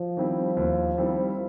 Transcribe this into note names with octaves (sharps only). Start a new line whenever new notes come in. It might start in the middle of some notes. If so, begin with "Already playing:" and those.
Already playing: F3
D#3 G3 C4 E4
D#2
D#3 G3 C4 E4